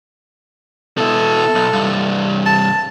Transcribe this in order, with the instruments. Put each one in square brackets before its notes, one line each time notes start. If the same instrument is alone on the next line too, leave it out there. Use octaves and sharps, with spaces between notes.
[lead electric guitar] B2 E4 [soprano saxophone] A4
[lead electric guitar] B1
C2 G2
[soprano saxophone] A5